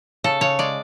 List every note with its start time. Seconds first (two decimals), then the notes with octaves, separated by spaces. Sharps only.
0.24 C#3 A4
0.41 C#3 C#5
0.59 G#3 D5